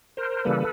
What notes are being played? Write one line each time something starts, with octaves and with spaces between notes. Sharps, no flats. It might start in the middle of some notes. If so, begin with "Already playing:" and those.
A#4 C5
C#3 E3 G3 A#3 A4 B4